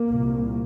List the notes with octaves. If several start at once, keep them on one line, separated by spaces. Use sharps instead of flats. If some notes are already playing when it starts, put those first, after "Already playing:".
Already playing: A#3
C2 A#2